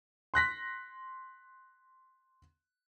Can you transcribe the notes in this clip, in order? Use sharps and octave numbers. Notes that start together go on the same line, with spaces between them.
C6 F#6 A#6 B6